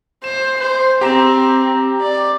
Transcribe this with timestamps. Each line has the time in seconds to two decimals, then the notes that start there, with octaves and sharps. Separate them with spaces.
0.24 C5 E7
0.60 C5
1.01 C4 G4 A#5 E7
2.01 D5